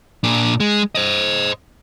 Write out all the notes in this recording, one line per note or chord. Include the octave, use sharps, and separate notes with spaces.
A#2 D4
G#3
C5 D#5